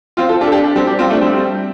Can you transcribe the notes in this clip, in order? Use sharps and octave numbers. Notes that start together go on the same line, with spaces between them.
C4 F4
F4 A4
D4 G4
A4
D4 G4
D4 G4
G3 C4
D4 G4
C4 F4
A3 D4
G3 C4